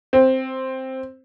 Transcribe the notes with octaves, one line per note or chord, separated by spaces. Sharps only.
C4